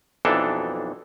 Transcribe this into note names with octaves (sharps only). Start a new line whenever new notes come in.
B1 F2 E3 D4 D#4 A4